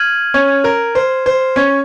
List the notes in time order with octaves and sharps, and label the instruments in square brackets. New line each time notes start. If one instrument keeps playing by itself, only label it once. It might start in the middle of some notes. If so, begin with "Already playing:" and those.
Already playing: [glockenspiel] F6 G#6 D#7 F#7
[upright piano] C#4 C#5
A#4
C5
C5
C#4 C#5